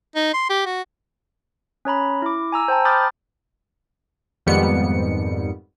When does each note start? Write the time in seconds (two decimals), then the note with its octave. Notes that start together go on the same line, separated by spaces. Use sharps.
0.15 D#4
0.34 C6
0.50 G4
0.66 F#4
1.85 C#4 C#5 A#5 B5
2.22 E4 D6
2.52 G#5 A#5 E6
2.68 C5 G5 A5 A#5
2.85 B5 D6 D#6 F6 G6 A6
4.46 F2 G#2 D#3 G3 B3 C#7